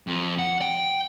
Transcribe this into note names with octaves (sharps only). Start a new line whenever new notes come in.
F2
F#5
G5